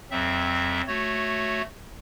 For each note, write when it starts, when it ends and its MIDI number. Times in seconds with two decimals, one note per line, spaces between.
0.11 0.81 41
0.11 0.81 54
0.11 0.81 60
0.11 0.81 76
0.87 1.62 57
0.87 1.62 66
0.87 1.62 73